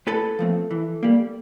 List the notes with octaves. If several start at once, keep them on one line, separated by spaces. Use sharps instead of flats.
A2 A4 B4
F3 A3 C4
E3
G3 A#3